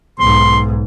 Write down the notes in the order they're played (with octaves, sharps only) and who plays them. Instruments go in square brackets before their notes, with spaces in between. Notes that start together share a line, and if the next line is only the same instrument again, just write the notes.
[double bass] B1 G#2 [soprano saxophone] C6